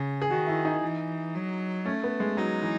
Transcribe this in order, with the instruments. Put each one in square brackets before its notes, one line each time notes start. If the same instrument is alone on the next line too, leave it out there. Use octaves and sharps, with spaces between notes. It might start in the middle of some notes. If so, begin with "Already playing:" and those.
Already playing: [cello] C#3
[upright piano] G#4
[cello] D#3 [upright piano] F#4
[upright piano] E4
D#4
[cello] E3
F#3
[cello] A3 [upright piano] C#4
[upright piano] B3
G#3
[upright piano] F#3 [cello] D#4
[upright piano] E3